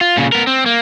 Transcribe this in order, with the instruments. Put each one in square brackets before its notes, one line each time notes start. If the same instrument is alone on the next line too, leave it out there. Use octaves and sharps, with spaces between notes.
[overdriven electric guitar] F4
A#2 C#3
B3 A#4
C4
A#3